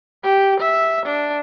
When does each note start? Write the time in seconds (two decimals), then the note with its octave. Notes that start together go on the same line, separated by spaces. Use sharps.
0.24 G4
0.61 E5
1.06 D4